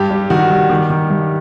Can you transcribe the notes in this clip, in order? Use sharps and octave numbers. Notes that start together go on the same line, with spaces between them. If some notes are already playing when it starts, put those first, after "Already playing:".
Already playing: G2 G4
G3
D#3 F#4
G3
D#3 G4
D#3
G2